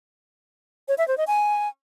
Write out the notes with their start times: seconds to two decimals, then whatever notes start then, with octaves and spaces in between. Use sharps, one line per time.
0.88 C#5
0.98 E5
1.08 C5
1.17 D#5
1.27 G#5